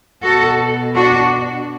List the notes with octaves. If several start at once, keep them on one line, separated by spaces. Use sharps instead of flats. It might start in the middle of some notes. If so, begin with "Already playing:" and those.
B2 F#4 A4
D4 F#4